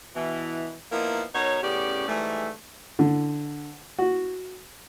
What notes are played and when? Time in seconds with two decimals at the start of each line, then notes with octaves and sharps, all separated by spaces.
0.15 B2 E3
0.92 F3 A#3 B3 D#4 E4 A#4
1.35 B2 D#4 F#4 A#4 C#5
1.63 A2 C#3 B3 C#4 G4 D5
2.08 G#2 E3 G3 A3
2.99 D3
3.99 F#4